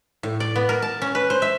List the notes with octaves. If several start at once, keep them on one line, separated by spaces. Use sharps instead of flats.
A2
D5
B3
A#4
A5
C#4
B4
C5
E5